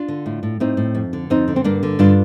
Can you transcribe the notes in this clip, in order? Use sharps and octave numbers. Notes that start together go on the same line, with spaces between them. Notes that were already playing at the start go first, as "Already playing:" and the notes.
Already playing: D4 F4
D3
A2
A2
A2 C4 D#4
A2
F2
D3
F2 C4 D#4
D3
C4
G2 A#3 D4
D3
G2 D4 F4